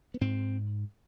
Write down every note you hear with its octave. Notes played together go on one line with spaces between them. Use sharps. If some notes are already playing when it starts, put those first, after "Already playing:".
B3
G#2 C4